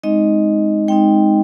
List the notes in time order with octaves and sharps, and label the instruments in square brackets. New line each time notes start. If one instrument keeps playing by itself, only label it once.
[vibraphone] G#3 C4 D#4 D#5
G#3 C4 D#4 G5